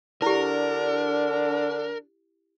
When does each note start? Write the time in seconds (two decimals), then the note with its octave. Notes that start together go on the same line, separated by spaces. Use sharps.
0.22 D3 D4 E4 G4 A#4